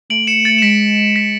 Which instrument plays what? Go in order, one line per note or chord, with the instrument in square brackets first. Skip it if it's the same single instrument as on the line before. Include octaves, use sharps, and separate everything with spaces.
[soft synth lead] A3 [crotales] D7 F#7
[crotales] C#7 E7
A6 C#7
E7
[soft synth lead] G#3 [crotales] B6 D7
[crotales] B6